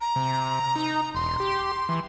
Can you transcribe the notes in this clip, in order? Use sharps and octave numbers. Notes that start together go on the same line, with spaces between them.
A#5
C3
D#4
E1 C6
G4
E3